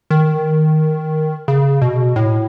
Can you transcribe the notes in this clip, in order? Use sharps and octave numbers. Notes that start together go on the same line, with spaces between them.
D#3
C#3
B2
A2